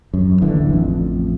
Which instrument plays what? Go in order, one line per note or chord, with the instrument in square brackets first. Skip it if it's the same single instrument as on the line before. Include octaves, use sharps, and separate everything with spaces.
[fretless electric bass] F#2
D#1 A1 D3 E3
A1 F2